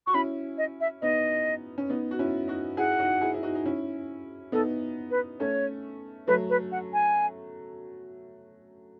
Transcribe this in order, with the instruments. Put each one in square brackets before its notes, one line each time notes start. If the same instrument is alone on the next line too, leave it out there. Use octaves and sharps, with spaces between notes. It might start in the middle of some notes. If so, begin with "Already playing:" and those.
[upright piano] F#4 [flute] C#6
[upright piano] C#4 E4 [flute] B5
[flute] D#5
E5
[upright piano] B3 D#4 [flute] D#5
[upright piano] C#4
B3 D#4
F#4
C#4 E4
D#4 F#4
[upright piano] E4 G#4 [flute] F#5
[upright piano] D#4 F#4
E4 G#4
E4
D#4 F#4
D#4
C#4 E4
[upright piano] B3 D#4 [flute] A4
[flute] B4
[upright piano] A3 C#4 [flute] C#5
[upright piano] F#3 A3 [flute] B4
[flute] B4
F#5
G#5